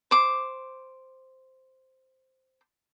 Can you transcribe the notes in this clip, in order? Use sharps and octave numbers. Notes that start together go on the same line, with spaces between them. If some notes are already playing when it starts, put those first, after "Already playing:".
C5 D6